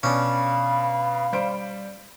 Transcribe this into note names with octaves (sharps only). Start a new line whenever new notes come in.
B2 C#4 D4 F5 B5
G3 C5 D7